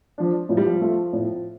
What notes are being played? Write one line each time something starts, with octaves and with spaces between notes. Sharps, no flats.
F3 D4
A2 F3
G3
F3
A3 F4
A2